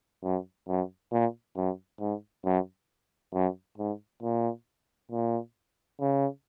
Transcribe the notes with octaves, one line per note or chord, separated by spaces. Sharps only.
F#2
F#2
A#2
F#2
G#2
F#2
F#2
G#2
A#2
A#2
C#3